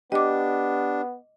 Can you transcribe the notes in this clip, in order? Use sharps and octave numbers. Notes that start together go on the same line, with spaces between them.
B3 D4 G4 D#5 D6